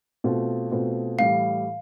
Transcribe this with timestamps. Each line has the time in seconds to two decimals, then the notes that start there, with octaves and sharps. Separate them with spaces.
0.24 B2 A3 C4 F4
0.71 B2 A3 C4 F4
1.19 A2 E3 G3 F5